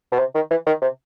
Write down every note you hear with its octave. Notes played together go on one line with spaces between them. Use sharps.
B2
C3
D#3
E3
D#3
C3